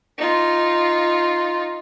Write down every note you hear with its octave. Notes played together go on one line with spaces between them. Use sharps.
D#4 F4